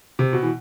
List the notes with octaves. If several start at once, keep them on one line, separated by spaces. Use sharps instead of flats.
C3
B2
E3